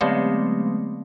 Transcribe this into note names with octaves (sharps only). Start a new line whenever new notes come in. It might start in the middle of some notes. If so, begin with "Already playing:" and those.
D3 F#3 G#3 A3 B3 C4